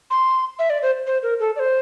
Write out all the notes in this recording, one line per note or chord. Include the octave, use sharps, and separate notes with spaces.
C6
E5
D5
C5
C5
A#4
A4
D5
C5